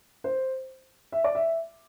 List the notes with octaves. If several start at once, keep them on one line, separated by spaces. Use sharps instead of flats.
C5
E5
D5
E5